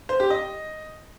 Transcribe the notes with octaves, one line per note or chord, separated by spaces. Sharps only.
C5
G4
D#5